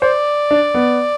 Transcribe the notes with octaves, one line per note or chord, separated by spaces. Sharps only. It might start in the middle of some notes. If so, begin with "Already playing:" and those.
C5 D5
D4
B3